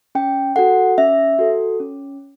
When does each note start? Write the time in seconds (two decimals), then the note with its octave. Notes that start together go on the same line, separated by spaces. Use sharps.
0.15 C#4 G5
0.56 F#4 A4 F#5
0.98 C#4 E5
1.39 F#4 A4
1.80 C#4